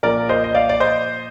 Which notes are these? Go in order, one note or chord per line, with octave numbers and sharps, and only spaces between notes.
A#2 F3 A#4 D5
C5 D#5
D#5
D5 F5
D5
C5 D#5